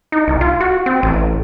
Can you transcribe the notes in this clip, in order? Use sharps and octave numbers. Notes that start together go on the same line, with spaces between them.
D#4
C2
F4
F#4
C4
A1